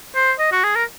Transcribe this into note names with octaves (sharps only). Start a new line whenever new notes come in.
C5
D#5
F#4
G#4
A#4